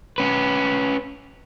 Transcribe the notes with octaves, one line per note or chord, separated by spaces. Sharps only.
C#4 B4